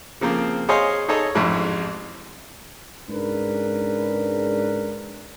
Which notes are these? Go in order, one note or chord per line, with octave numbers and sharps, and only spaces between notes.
C#3 F3 A#3 C4
G#4 C5 C#5 D#5 F5 G#5
D#4 G#4 A4 C#5 D#5
A1 F2 G#2 E4
G#2 C#3 D4 A#4 B4